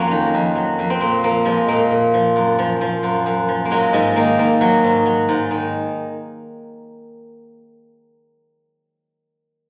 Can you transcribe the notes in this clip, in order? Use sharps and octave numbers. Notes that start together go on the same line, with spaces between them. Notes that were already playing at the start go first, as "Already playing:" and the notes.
Already playing: F2 F#3 A#3 C#4
D#3
F2
F#3
F2
C4
A#2 A#3
F3 A#3
F3 G#3
A#2 A#3
A#2
F3
F#2
F3
F3
F#2
F#2
F3
A#3
F#3 G#3
G#2 G#3
D#3 A#3
G#2 A#3
F#3
G#2
F#3
G#2
D#3